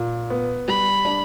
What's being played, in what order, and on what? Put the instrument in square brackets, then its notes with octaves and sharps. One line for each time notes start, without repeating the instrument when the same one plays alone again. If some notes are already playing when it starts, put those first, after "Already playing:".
Already playing: [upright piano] A#2
B3
[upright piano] G3 [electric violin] B5
[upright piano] D4